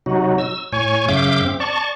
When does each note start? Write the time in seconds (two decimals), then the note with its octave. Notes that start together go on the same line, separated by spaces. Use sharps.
0.06 C3 F#3 D#4 F#4
0.38 E6
0.72 A2 C#5 G#5 C#6
1.08 F#2 C#3 E5 F5 D6 G6
1.45 C4
1.60 D5 A5 C#6